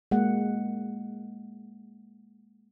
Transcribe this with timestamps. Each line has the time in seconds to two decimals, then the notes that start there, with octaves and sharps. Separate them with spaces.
0.11 G#3 A#3 F#5